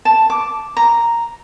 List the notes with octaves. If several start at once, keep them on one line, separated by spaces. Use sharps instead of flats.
A5
D6
A#5